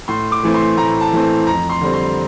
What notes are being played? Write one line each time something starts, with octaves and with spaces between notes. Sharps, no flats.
A2 C6
D6
E3 A3 C4
C6
A2 A#5
A5
E3 A3 C4
F2 A#5
C6
D3 G3 C4
C6